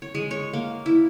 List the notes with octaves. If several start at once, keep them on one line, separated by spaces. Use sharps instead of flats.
C#5
G#3
C#5
A#3
E4